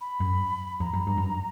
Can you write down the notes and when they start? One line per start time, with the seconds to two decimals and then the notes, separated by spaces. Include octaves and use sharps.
0.01 B5
0.20 F#2
0.80 F2 A#5
0.93 F#2
1.07 G2
1.17 F#2